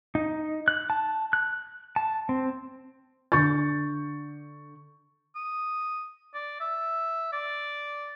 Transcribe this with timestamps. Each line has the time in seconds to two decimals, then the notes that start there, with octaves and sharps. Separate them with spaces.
0.15 D#4
0.68 F#6
0.90 A5
1.33 F#6
1.96 A5
2.29 C4
3.32 D3 C#6 G6 A6
5.36 D#6
6.34 D5
6.60 E5
7.33 D5